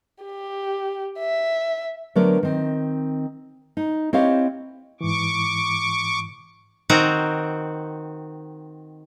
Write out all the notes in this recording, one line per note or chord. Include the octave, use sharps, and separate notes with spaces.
G4
E5
D3 F#3 A3 B3 A#4 D5
D#3 C4
D#4
C4 E4 G4 C#5 D#5 F5
G#2 E3 C#6 D6
D#3 C4 F#4 A#5